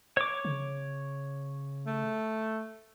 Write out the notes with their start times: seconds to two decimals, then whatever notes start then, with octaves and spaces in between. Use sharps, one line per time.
0.17 C#5 D6
0.45 C#3
1.87 A3